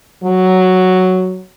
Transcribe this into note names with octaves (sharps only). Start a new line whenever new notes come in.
F#3